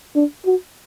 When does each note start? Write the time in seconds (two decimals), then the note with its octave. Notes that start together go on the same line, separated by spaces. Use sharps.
0.15 D4
0.45 F#4